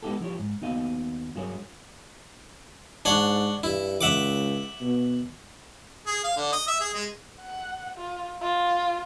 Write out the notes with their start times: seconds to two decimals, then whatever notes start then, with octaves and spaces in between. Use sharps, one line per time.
0.03 G#3 B3 D#4 F4 G4 A4
0.21 F3 E4 G4 C#5
0.39 G#2
0.62 D#2 B3 D#4 F#4 D#5 F5
1.35 G2 F#3 E4 G#4 A#4 C#5
3.05 G#2 D4 C#5 F#5
3.63 G2 E4
4.01 C#2 E5 F#5 D6
4.81 B2
6.06 G#4
6.24 F5
6.36 D3
6.52 D#5
6.68 E5
6.80 G#4
6.94 G#3
7.41 F#5
7.97 F4
8.42 F4